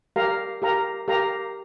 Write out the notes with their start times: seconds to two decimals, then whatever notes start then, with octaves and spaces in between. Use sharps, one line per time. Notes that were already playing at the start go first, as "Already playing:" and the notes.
0.16 G4 A#4 F5 A#5
0.62 G4 A#4 F5 A#5
1.08 G4 A#4 F5 A#5